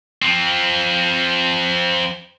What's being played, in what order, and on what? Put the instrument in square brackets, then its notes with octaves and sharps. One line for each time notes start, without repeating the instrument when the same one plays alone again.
[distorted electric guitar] F3 C4